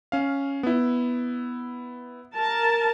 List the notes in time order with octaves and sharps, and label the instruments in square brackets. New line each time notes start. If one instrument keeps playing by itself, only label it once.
[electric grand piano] C#4 F5
B3 E4
[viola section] A#4 A5